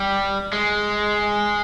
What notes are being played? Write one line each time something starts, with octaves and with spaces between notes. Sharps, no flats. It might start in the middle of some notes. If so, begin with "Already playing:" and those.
Already playing: G3
G#3